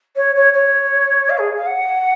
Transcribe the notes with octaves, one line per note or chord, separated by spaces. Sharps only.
C#5
C#5
C#5
F5
G#4
F5
F#5